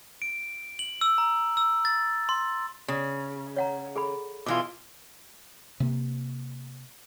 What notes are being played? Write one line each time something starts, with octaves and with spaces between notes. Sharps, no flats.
D7
F#7
E6
A#5
E6
A6
C6
C#3
C#5 F#5 A#5
G#4 A4 B5
B2 E3 F4 D6
C3 A#3